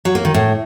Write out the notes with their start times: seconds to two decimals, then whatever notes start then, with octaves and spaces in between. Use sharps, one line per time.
0.05 F#3
0.15 A#3
0.25 D#3
0.35 A2